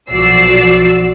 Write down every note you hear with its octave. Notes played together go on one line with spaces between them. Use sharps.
B1 F3 F#4 D5 E6 C7